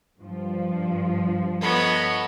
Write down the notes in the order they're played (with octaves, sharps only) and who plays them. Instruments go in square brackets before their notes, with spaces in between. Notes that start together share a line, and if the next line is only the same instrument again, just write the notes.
[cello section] G2 F3
[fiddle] B3 A4 [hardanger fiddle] C#5 D#5